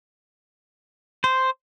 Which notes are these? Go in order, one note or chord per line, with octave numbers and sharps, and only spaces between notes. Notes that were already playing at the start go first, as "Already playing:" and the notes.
C5